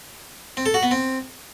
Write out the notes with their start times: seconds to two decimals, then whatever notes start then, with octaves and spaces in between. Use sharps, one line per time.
0.57 C4
0.66 A4
0.74 F#4
0.83 B3
0.91 C4